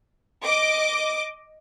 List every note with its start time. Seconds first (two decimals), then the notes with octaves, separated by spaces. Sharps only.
0.44 D#5 D6